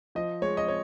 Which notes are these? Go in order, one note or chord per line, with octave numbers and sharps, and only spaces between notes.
F3 D#5
G#3 C#5
D#5
C#5